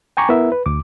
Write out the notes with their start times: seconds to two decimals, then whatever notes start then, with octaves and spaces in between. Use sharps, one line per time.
0.17 G5 G#5 A#5 C#6 D6
0.29 B3 E4 A#4 E5
0.52 B4
0.66 D2 D6